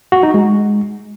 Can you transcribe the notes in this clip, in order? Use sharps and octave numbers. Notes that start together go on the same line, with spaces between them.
F#4
D#4
G#3